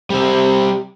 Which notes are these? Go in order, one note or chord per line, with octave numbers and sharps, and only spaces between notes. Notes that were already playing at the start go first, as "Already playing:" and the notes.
C3 G3 E5